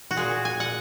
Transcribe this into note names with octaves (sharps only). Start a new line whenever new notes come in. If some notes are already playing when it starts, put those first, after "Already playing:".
F#4
A#2 G#3 G#4
G#5
F#5